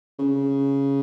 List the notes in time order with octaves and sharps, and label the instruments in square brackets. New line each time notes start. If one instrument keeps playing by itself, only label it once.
[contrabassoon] C#3